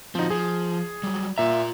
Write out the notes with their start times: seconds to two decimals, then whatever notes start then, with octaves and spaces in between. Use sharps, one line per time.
0.15 F3 C4 D#4 F#4
0.30 F3 G#4
1.03 F#3 G3
1.38 A#2 F4 E5 A#5